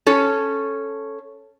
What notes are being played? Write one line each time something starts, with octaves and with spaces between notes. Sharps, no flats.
C#4 A4 C#5